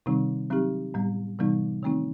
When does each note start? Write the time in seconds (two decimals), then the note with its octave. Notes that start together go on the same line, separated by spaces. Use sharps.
0.06 C3 D#3 G3 C4 D#4
0.50 F#3 C4 D#4 G4
0.94 A2 G3 B3
1.39 C3 E3 G3 B3 D#4
1.83 D#3 A3 C4 D#4